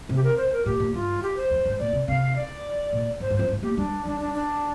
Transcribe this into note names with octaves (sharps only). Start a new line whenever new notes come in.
C3
G4
A#4
C5
A#4
A#2 G4
A#2
G2 F4
G4
C5
F2
G2
A#2 D5
C3
C3 F5
D5
A#2
G2 C5
G2
F2 C5
G2
A#3 G4
G3 D4
G3 D4
D4
D4